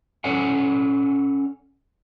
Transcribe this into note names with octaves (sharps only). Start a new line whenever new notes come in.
C#4 A4 C#5 D5 F#5 G#5